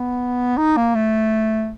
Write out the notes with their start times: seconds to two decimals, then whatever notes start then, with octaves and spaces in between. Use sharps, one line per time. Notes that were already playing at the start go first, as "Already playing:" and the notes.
Already playing: B3
0.57 D#4
0.77 A#3
0.95 A3